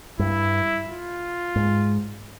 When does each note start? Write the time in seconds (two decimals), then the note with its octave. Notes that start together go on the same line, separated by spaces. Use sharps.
0.19 G2 E4
0.88 F4
1.56 G#2